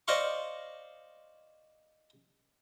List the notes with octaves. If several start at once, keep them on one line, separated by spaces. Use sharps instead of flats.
C5 D5 D#5 F5 C6 C#6